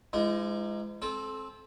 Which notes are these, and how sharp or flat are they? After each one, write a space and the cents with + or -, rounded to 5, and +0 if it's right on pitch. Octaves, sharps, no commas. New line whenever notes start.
F3 -45 G#3 +0 D#4 +0
C4 +15 A4 -25